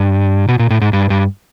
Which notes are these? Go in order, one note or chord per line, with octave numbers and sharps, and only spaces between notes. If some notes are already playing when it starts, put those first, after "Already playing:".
Already playing: G2
B2
A#2
A2
G#2
G2
G2